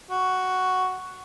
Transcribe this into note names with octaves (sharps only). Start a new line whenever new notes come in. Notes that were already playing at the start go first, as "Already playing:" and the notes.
F#4